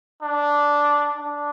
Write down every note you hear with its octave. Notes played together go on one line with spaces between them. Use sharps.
D4
D4